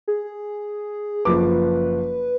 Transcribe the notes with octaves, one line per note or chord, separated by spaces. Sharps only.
G#4
F#1 F3 B4 D6